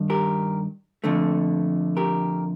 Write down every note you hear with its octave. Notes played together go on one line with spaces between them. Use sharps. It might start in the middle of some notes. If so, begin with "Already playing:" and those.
Already playing: G2 D#3
G4 A#4
F2 D3 A3
G4 A#4